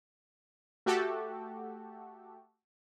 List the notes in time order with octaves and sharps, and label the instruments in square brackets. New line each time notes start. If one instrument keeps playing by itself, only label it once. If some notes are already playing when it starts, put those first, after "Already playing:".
[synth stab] A3 F#4 G4 A4